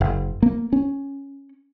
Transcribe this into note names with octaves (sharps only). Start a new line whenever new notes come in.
F#1
A#3
C#4